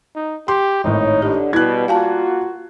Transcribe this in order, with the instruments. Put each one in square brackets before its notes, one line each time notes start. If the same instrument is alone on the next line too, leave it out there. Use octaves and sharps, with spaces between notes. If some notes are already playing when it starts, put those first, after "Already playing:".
[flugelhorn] D#4
[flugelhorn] G4 [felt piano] C6
[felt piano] G#1 A2 [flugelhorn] D#4 [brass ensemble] C#5
[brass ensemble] D3 [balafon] G4
[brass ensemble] B2 [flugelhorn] G3 [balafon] E4 [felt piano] F#6 G#6
[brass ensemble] A#3 F4 F#4 [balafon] F5 G#5 A5